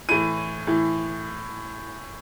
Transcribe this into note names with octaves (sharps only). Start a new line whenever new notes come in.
A2 E3 D#7
A2 E3